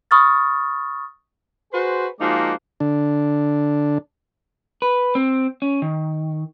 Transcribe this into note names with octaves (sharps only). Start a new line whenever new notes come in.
B5 C#6 D#6 F6 A6
F#4 G#4 B4 C5
F3 G#3 A#3 D#4 F#4 D5
D3 D4
B4
C4
C#4
D#3